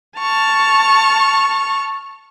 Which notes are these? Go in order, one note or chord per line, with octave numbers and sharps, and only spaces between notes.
A5 C#6 F6